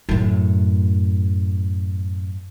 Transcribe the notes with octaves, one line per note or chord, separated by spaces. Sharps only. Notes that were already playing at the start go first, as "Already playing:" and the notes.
F#2 A2